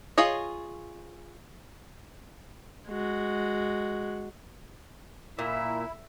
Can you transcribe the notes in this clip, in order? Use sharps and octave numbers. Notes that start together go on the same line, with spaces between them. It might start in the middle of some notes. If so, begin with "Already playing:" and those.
F4 G#4 C#5 D#5
G#3 F#4
A#2 E4 E5